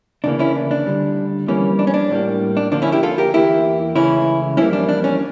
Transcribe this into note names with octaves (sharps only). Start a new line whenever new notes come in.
D2 C#3 E3 A#3 D4
C#4 E4
D4
D4
D2 D3 G3
F2 E3 G3 A#3 C#4
D4
C#4
D4
A2 G3 A#3
D4
D2 D3 F3 A#3 D4
C#4 E4
E4 G4
F4 A4
G4 A#4
E2 E3 A#3 E4 G4
C#2 C#3 E3 A3 C#4 E4
F2 E3 G3 A#3 C#4 E4
D4
D4
C#4